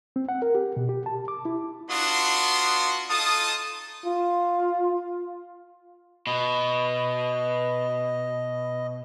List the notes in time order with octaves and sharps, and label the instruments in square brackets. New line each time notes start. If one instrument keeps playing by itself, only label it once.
[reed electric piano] C4
F#5
A#4
G4
B2
G4
A5
D6
E4
[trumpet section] B3 D4 F4 F#4 C6 D#6
D#4 F4 A4 A5 D#6
[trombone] F4
[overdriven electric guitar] B2 [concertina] D#5